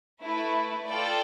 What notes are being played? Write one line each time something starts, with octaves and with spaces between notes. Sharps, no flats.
A3 E4 B4
F4 A4 D5 G5